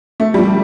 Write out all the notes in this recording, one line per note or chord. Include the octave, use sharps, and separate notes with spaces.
A3
G3
F3